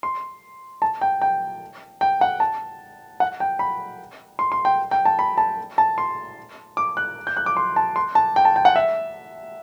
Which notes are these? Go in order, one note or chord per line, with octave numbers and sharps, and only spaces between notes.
C6
A5
G5
G5
G5
F#5
A5
F#5
G5
B5
C6
C6
G5
G5
A5
B5
A5
A5
C6
D6
F#6
G6
F#6
D6
C6
A5
C6
A5
G5
A5
G5
F#5
E5